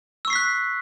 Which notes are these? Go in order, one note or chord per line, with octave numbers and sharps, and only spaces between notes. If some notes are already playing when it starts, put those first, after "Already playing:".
C#6 E6 F#6 B6 C7